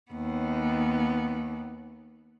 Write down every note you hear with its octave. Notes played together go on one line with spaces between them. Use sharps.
D#2 B3